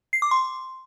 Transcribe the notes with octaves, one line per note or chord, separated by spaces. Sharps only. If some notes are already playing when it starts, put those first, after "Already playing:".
C7
D6
C6